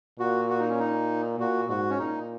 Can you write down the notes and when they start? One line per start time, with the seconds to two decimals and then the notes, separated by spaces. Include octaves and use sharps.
0.20 A#2 F#4
0.50 F#4
0.59 D#4
0.69 C#4
0.80 D#4
1.39 A#2 F#4
1.69 G#2 F#4
1.89 C#4
1.98 A#2 D#4